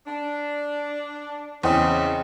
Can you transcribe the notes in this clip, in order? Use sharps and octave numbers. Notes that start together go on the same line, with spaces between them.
D4
E2 C#3 C4 D#5 B5